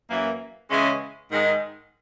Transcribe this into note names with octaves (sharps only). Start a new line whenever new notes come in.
F#2 E3 A#3
C#3 E3 G#3 C#4
G#2 D#3 G#3